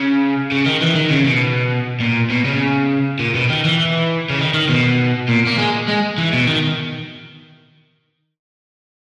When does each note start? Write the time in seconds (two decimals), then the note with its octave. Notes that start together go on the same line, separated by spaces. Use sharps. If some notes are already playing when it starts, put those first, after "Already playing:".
Already playing: C#3
0.52 C#3
0.66 D#3
0.81 E3
0.96 D#3
1.11 C#3
1.26 B2
2.00 A#2
2.30 B2
2.45 C#3
3.20 A#2
3.35 B2
3.50 D#3
3.65 E3
4.30 C#3
4.39 D#3
4.54 D#3
4.69 B2
5.28 A#2
5.47 A#3
5.58 G#3
5.88 G#3
6.18 E3
6.33 B2
6.47 D#3